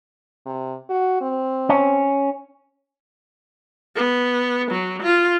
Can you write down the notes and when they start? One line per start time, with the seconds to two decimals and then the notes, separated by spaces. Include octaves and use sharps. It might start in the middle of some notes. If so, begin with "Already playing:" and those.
0.46 C3
0.89 F#4
1.21 C4
1.69 C#4
3.96 B3
4.71 F#3
5.02 F4